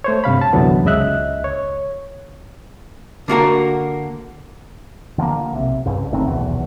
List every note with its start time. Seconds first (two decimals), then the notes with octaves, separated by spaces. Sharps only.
0.04 A3 C5 C#5
0.24 G2 C3 F5 B5
0.41 A5
0.53 C2 F#2 D3 E3 F#3 B3
0.85 C#2 C#3 D#5 E5 F#6
1.44 C#5
3.28 D3 A#3 F#4 A#4
5.18 D3 F3 G#3 A#3
5.53 B1 C3
5.86 C2 G2 C#3
6.12 F#1 A2 D#3 C4
6.26 D#1 B1 E2